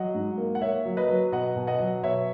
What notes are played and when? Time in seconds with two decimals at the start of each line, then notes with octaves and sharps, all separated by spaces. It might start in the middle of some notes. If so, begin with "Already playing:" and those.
Already playing: F#3 D#5 F#5
0.14 G#2
0.38 A#3
0.55 F#5
0.61 A#3 C#5 E5
0.85 F#3
0.97 B4 D#5
1.08 F#3
1.32 B2 D#5 F#5
1.56 B2
1.67 D#5 F#5
1.80 F#3
2.03 B2 C#5 E5